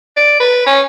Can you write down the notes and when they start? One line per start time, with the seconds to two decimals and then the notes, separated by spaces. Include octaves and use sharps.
0.17 D5
0.40 B4
0.66 C#4